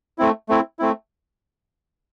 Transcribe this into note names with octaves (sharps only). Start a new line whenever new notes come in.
A3 C4 E4
A3 C4 E4
A3 C4 E4